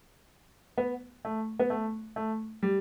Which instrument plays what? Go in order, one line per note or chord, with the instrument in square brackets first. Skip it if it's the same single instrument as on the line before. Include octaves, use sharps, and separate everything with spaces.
[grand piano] B3
A3
B3
A3
A3
G3